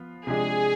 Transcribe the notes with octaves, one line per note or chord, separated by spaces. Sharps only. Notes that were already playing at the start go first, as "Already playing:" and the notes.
Already playing: F3 B3 F4
C3 F3 G#3 D4 G#4